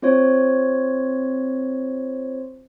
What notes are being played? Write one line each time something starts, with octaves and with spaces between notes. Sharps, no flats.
C4 F4 C5 C#5